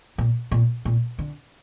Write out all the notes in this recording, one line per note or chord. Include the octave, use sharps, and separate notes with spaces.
A#2
A#2
A#2
D3